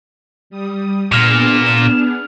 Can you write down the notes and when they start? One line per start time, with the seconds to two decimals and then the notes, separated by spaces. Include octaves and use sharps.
0.50 G3 D#6
1.12 A#2 B3 D4 G#4 F6 E7 F7